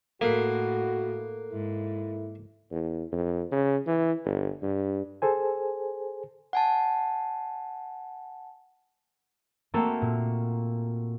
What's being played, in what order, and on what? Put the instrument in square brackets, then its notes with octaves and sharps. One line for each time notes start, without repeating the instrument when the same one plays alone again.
[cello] A2 [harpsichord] A#3 [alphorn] F#4 [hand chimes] A4 A#4 F#6
[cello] G#2 [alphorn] E4
[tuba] E2
F2
C#3
E3
G1
G2
[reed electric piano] G#4 A4 C5 G#5
[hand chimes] F#5 G#5 A5
[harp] A3 A#3 C4 F#4 A4 A#4
A#2